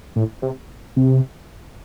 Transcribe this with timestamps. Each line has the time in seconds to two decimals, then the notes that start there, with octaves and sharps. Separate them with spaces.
0.16 A2
0.42 C3
0.96 C3